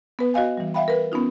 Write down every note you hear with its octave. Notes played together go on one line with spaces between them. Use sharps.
B3 B4
F#4 D#5 F5 G#5
E3 G3
E5 F5 G5 B5
A#4 B4
B3 C#4 D#4 F4